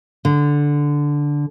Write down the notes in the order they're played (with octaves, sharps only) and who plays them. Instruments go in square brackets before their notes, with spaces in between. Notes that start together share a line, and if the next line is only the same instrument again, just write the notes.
[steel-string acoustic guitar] D3